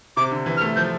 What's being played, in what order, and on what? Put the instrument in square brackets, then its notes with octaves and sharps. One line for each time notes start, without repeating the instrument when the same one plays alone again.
[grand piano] C3 [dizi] D6
[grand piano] D3
E3
[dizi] F6
[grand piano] A3
[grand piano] F3 [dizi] G6